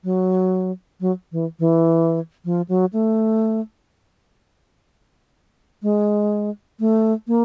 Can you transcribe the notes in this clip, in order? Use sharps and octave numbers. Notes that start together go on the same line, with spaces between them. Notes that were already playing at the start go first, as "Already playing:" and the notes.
F#3
F#3
E3
E3
F3
F#3
A3
G#3
A3
A#3